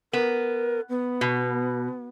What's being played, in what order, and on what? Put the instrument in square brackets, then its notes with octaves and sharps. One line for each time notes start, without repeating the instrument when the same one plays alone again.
[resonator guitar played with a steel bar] B3 [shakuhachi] A#4
[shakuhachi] B3
[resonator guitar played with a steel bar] B2